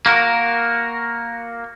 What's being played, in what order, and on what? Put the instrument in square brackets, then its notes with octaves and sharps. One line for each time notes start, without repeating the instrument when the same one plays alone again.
[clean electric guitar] A#3 F#4 A#4